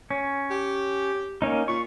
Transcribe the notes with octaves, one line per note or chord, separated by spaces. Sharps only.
C#4
G4
A#3 C#4 D#4
A#2 C#6